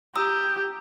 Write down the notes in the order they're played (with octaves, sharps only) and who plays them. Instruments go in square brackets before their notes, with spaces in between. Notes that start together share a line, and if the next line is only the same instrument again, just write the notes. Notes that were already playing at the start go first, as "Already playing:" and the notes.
[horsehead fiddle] G4 [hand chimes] A#5 D#6 E6